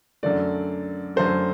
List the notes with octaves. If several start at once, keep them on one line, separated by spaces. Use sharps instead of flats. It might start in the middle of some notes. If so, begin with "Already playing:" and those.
F#2 D3 A3 D5
F#2 D3 A3 C5